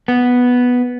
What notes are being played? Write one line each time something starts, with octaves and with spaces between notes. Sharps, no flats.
B3